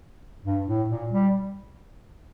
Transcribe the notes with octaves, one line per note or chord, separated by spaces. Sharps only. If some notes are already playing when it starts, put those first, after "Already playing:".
G2
A2
A#2
G3